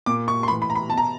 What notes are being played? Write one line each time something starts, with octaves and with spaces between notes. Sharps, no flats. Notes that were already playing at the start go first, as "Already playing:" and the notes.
A#2 D6
C#6
C6
A2 E3 B5
B5
A#5
B5
B2 A5
A#5